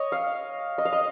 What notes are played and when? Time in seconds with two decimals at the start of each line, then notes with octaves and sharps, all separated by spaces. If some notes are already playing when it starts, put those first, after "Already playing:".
Already playing: C#5 D#5
0.12 F5
0.78 D#5
0.85 F5
0.93 D#5